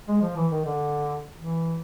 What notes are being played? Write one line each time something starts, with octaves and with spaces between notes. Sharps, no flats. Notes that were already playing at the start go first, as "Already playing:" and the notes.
G#3
F3
E3
D#3
D3
E3